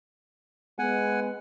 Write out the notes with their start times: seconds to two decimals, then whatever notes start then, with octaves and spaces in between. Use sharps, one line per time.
0.79 G#3 B3 F#5 G#5